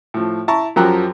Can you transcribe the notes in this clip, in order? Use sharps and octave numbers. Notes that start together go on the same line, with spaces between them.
A2 F3
E4 A5 A#5 C#6
F#2 F3 F#3 G4 A#5 F#6